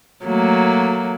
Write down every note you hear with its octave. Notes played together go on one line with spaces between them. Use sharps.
F#3 A3 A#3